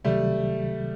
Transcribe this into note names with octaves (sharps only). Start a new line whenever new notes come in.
C#2 C3 D#3 F#3 G3 A3